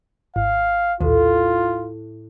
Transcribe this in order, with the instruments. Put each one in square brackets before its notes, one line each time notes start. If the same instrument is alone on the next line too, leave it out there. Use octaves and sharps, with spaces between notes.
[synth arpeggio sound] G#1 [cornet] F5
[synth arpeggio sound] A#1 D#2 [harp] A2 [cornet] F4